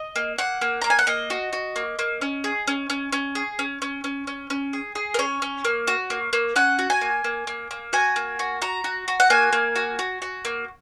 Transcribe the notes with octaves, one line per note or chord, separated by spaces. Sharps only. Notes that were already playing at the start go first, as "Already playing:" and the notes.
Already playing: D#5
A#3
A#3 F#5
A#3
A#3 A#5
G#5
F#5
A#3 D#5
F#4
F#4
A#3
A#3
C#4
G#4
C#4
C#4
C#4
G#4
C#4
C#4
C#4
C#4
C#4
G#4
G#4
A#4
C#4 C#5
C#4
A#3
F#4
A#3
A#3
C#4 F#5
F#4
G#5
A#3
A#3
A#3
A#3
F#4 G#5
A#3
F#4
F#4 A#5
F#4
F#4
F#5
A#3 G#5
A#3
F#4
F#4
F#4
A#3